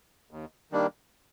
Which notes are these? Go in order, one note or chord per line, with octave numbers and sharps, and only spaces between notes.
D#2
D#3 G3 A#3 D4